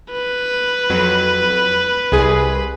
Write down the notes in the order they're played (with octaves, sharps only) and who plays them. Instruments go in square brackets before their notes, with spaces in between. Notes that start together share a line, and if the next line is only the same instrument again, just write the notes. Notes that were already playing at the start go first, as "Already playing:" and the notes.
[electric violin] B4
[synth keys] F2 F#3
C2 G#4